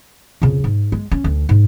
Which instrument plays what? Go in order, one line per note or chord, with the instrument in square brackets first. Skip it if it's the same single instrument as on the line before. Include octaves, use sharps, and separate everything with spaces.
[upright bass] F2 C#3
G#2
G#3
C#4
D2
G#2